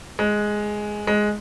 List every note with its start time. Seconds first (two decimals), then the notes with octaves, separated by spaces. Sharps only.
0.19 G#3
1.07 G#3